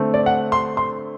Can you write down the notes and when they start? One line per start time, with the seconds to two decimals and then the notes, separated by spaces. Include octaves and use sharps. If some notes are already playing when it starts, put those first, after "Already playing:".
Already playing: D3 A3 C4
0.14 D5
0.26 F#5
0.52 C6
0.77 C6